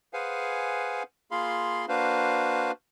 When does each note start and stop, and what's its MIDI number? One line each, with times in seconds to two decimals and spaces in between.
0.13 1.03 68
0.13 1.03 71
0.13 1.03 72
0.13 1.03 77
0.13 1.03 78
0.13 1.03 80
1.31 1.86 58
1.31 1.86 65
1.31 1.86 68
1.31 1.86 77
1.31 1.86 83
1.31 1.86 84
1.88 2.71 58
1.88 2.71 62
1.88 2.71 66
1.88 2.71 71
1.88 2.71 72
1.88 2.71 77